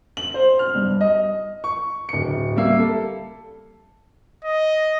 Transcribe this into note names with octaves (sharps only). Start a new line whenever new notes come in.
F#7
C5
F6
G2
D#5
C#6
D1 C#7
G3 A#3 E5 C7
A4
D#5